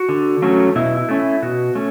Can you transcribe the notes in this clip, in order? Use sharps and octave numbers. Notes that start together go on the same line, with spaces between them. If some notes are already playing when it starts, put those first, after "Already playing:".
Already playing: F#4
D3
F#3 A3 C#4
B2 E4
E4
A3 C#4
E4
B2 F#4
A3 C#4